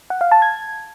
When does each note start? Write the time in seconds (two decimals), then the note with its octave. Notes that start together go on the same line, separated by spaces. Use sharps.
0.10 F#5
0.21 F5
0.32 A5
0.42 G#6